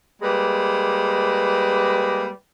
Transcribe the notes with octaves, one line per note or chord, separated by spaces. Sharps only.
G3 G#3 A#3 B4